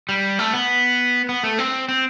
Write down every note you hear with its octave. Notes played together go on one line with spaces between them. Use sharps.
G3
A3
B3
B3
A3
C4
C4